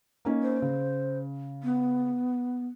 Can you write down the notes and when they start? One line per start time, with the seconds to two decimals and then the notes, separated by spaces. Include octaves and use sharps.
0.25 A#3 C#4 D#4
0.43 C5
0.62 C#3
1.63 B3